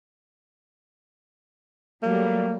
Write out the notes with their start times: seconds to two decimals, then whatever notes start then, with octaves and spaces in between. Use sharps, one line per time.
2.03 F#3 G3 A3 A#3